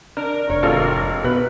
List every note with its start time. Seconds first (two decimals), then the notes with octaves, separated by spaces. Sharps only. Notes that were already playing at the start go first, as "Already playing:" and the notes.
0.17 D4 A#4
0.50 F1 C#5
0.63 G#1 F4 A4
1.24 B2 B4